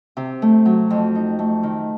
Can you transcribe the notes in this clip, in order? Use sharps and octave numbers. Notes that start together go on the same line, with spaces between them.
C3
A3
F#3
F2
D#4
A3
D#3